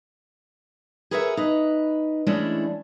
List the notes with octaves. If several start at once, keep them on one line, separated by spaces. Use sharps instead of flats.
G#4 A#4 B4 C#5 D5 E5
D#4 B4
E3 G#3 A3 C#4 D4 E4